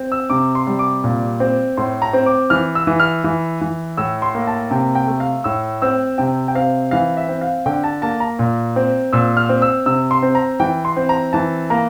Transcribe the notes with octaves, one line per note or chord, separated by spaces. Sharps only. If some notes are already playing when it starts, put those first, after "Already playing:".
Already playing: C4
E6
C3 D6
C6
G3
D6
A#2
C4
A2 C6
A#5
C4
D6
E3 F6
E6
E3
F6
E3
E3
A2 E6
C6
A#3
A5
C3 G5
G5
A3
F5
A2 E6
C4 E6
C3 G5
G5
C4 F5
E3 F5
E5
C4
F5
D3 G5
A5
A#3 A5
A#5
A#2
C4
A#2 E6
F6
C4
E6
C3 E6
C6
C4
A#5
E3 G5
C6
C4
A#5
E3 A5
A#3 A#5